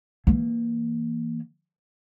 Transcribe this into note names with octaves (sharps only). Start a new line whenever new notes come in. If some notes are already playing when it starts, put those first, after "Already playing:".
E3 A#3